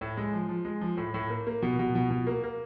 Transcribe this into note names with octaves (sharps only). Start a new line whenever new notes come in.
A2
G#3
F3
F3
G#3
F3
A2
A2
A#3
A#3
B2
B2
B2
B2
A#3
A#3